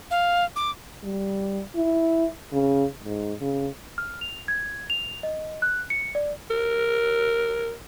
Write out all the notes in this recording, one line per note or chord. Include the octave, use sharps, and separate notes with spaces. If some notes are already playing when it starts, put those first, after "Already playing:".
F5
D6
G3
E4
C#3
G#2
C#3
F6
F7
G#6
F7
D#5
F#6
C#7
D5
A#4